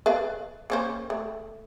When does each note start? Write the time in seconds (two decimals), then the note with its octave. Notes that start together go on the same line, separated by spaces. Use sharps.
0.06 B4 D5 F5
0.70 A#3 C#4 C5
1.10 A3